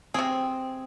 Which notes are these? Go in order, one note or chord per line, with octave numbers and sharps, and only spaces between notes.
C3 C4 G#4